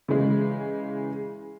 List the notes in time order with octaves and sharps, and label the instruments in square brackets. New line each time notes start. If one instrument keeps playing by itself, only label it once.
[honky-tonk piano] C#3 E3 G#3